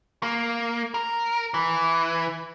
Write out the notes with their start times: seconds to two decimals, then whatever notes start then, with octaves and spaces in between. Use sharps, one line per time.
0.23 A#3
0.94 A#4
1.54 E3